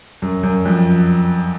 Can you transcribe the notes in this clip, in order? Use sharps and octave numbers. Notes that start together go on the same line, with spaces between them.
F#2
F#2
F2